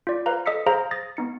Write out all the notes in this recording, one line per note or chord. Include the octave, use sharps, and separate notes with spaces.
F4 D5
B4 C5 F5 A#5
A4 D#5 D#6 E6 B6 C#7
G#4 C5 F5 A#5 A#6
D#6 A6 A#6
B3 D#4 C#7